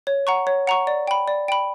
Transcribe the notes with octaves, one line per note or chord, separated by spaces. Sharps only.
C#5
F#5 A#5 C#6
C#5
F#5 A#5 C#6
D5
G5 B5
D5
G5 B5